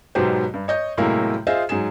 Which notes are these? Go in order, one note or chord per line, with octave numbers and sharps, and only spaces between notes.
G#2 B2 F#3 B3 G4 C5
G2
C#5 D#5 G6
A2 C3 F#3 G#3 A#3 E4
F4 G#4 C5 D#5 E5
G#2 F#3 G#4 E7